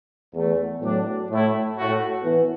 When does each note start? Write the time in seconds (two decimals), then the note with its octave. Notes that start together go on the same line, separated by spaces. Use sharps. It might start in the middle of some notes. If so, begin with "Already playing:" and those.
0.35 E2 E3 A3
0.82 A2 F#3 D4
1.29 A2 A3 E4
1.77 A2 A3 F#4
2.24 E3 B3